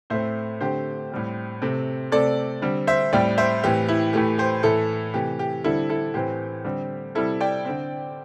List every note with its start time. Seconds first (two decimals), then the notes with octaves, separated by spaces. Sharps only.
0.10 A2 A3 C4 C5 E5
0.61 D3 A3 C4 G4 C5
1.12 A2 G3 C4
1.62 C3 A3 C4
2.12 C3 A3 C4 A4 D5
2.62 D3 G3 C4
2.87 C5 E5
3.13 A2 G3 C4 D5 G5
3.38 C5 E5
3.64 A2 E3 C4 G4
3.89 E4
4.13 A2 E3 A3 G4
4.38 G4 C5
4.63 A2 E3 A3 E4 A4
5.14 C3 E3 A3 G4
5.39 G4
5.64 D3 G3 C4 E4 A4
5.89 E4 A4
6.14 A2 E3 A3 C4 G4 C5
6.64 D3 G3 C4
7.15 C3 G3 C4 E4 A4
7.40 D5 G5
7.65 D3 C4